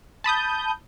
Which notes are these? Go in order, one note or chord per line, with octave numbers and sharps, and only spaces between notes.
A5 B5 D#6 G6